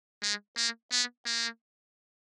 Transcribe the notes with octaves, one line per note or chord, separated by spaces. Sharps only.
G#3
A#3
B3
A#3